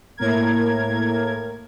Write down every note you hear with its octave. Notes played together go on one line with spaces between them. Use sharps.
A2 A#3 A#4 G#6